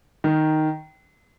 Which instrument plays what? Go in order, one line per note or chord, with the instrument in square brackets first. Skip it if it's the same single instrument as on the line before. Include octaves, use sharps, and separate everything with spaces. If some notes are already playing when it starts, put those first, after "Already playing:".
[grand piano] D#3